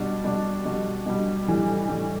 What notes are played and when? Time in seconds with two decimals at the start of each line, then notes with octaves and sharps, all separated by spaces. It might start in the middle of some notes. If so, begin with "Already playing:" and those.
Already playing: B2 G3 D4
0.24 B2 G3 D4
0.65 B2 G3 D4
1.06 B2 G3 D4
1.47 A2 E3 G3
1.88 A2 E3 G3